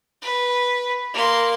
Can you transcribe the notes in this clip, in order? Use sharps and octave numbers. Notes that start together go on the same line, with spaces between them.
B4
A#3 C6